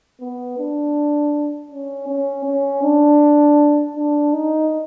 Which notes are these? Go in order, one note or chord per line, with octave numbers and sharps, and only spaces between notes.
B3
D4
C#4
C#4
C#4
D4
D4
D#4